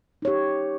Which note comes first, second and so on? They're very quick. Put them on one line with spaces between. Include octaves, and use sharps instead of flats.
D#4 C#5 G4